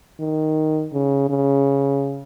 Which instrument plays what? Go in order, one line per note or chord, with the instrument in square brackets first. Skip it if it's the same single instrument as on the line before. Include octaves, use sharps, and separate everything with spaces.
[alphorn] D#3
C#3
C#3